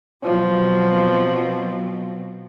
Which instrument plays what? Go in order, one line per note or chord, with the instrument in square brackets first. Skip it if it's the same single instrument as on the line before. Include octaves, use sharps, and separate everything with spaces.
[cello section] B2 F#3 C4 [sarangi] F3